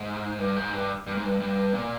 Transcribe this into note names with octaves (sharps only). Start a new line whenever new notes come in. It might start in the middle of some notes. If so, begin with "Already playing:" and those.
Already playing: G#2
G2
G#2
G2
G2
G#2
G2
G2
A#2